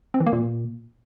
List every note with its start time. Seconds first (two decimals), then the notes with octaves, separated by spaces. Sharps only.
0.14 C4
0.20 E3
0.26 A#3
0.33 A#2